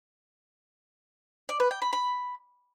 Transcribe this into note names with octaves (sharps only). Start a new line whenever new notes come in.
D5
B4
G5
B5
B5